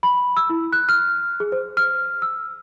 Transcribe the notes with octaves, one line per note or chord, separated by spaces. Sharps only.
B5
E6
E4
F#6
F6
G#4
C5
F6
E6